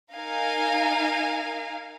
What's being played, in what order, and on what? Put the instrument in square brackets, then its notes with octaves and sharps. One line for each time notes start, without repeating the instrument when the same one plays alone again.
[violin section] D#4 A#4 F5 G#5